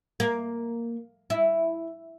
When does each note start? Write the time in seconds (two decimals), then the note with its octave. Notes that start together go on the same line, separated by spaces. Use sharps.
0.20 A#3
1.30 E4